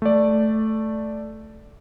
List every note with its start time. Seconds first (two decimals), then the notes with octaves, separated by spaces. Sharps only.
0.02 A3 D5